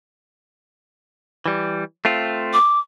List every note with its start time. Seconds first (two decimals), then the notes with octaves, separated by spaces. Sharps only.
1.46 E3 G3
2.05 A3 C4 F4
2.53 D6